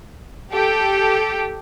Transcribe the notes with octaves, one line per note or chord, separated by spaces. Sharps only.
G4 A4